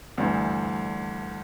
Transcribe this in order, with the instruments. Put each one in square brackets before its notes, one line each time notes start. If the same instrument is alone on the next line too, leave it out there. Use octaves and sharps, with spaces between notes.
[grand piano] D2 G2 E3